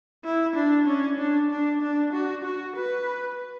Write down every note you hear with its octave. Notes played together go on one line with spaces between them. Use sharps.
E4
D4
C#4
D4
D4
D4
F#4
F#4
B4